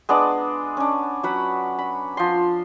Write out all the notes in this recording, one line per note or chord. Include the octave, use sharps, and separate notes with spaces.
G#3 B3 D4 D5
C#4 D4
F#3 F#5 B5
B5
F3 C6